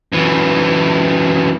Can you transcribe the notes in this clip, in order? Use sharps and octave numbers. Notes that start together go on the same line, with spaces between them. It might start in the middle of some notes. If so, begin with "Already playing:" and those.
F#2 E3